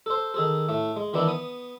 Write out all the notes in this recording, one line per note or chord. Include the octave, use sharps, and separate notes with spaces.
A4 C5
D#3 G#4 A4
A2 A3
G#3
D#3 E3 B3 D4 E4
B3 D#6